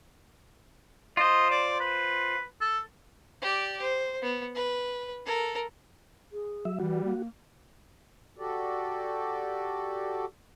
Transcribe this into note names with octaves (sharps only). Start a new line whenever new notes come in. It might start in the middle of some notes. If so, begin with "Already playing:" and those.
F4 C5 D#5
D5
B4
A4
G4 D5
C5
B3
B4
A4 A#4
G#4
F#3 E5
E3 G3 F#4
A#3
F#4 G4 A4 D5